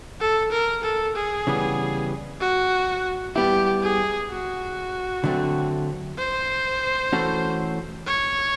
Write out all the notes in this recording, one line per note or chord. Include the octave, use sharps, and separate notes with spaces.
A4
A#4
A4
G#4
C#3 E3 G3 B3
F#4
G3 B3 E4 G4
G#4
F#4
D3 F#3 A3 C4
C5
E3 A3 C#4 F#4 A4
C#5